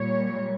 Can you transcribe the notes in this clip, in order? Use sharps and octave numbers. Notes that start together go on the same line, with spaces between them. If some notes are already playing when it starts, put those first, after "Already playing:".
Already playing: A#2 G3 C#5